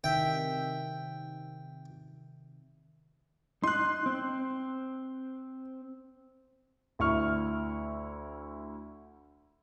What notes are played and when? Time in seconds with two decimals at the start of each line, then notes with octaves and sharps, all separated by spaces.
0.04 C3 D#3 E5 G5
3.64 D#4 C6 F#6
4.06 C4
6.99 D2 E4 C#6 F6